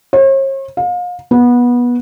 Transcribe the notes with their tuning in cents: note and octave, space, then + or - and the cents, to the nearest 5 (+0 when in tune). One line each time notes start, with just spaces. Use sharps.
C#5 -45
F5 +35
B3 -20